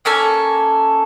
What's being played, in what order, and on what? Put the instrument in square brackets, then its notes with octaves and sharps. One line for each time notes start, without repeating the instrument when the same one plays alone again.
[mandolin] A#3 C#4 A4 G#5